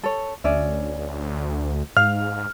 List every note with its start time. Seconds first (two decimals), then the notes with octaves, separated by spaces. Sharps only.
0.04 A4 C#5
0.44 D2 C#4 D5 E5
1.97 G#2 F5 F6